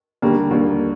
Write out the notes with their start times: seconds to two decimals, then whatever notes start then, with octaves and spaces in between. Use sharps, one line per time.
0.22 D#2 D3 G3 A#3
0.51 D#2 D3 G3 A#3